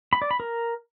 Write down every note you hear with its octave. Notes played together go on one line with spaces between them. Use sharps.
B5
D5
B5
A#4